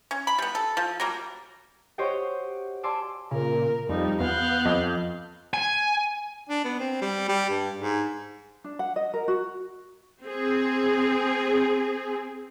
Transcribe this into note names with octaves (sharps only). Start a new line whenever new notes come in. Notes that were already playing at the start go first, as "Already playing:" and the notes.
C#4
B5
G3 B3
A4
F3
F#3 G3 A#3
F#4 G4 C5 C#5 D#5 G5
D5 G#5 A5 C6 D6 E6
A#2 C#3 A#4
F2 F3 G3 D#4
E2 B3 F5 F#6 G6
F2 D#5
G#5
D4
B3
C4
G3
G3
G2
G#2
D4
F#5
D#5
A#4
F#4
C4 G#4